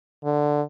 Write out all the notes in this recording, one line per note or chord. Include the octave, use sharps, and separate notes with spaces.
D3